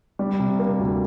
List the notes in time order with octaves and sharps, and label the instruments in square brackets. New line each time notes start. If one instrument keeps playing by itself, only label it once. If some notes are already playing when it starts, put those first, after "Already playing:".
[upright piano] G3
C3
A#3
D2